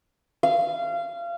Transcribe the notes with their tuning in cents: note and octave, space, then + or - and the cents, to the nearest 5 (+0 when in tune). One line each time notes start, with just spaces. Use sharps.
F5 -25